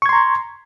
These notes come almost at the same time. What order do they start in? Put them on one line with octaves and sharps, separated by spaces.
C#6 G#6 C6 A#5